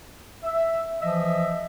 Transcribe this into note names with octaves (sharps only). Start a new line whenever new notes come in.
E5
E3 F3 D#5 E5